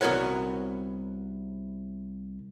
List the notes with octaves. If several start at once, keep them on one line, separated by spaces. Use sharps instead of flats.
C2 B3 F#4 A#4 C#5 F#5